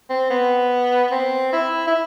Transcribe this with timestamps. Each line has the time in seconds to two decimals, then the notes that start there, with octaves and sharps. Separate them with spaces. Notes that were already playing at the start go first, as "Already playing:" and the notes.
0.10 C4
0.30 B3
1.12 C4
1.53 E4
1.87 E4